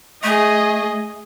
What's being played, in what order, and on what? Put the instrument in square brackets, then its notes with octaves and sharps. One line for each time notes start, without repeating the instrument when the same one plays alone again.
[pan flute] A3 [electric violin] G#4 D#5